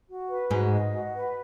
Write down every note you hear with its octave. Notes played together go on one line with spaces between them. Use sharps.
F#4
B4
G#2 G#3 F#4
D#5
F#4
B4